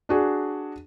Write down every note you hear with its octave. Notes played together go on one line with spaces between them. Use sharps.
D4 F#4 G#4